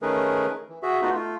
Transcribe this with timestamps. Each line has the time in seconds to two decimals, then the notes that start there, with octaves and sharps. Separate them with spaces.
0.02 D#3 A3 C#4 G#4 A#4 B4
0.70 E3
0.83 F#4 G#4 E5
1.02 A3 B3 D#4 F4 F#4
1.14 A3 F4